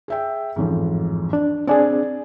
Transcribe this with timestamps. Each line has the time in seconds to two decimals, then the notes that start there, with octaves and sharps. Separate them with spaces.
0.08 G#4 E5 G5
0.56 A1 F2 G#2
1.33 D4
1.67 C4 D4 G#4 D5 G#5